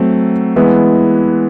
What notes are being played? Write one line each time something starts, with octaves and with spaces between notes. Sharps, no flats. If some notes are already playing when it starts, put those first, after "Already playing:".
Already playing: F#3 A3 C4
E3 G#3 B3 E4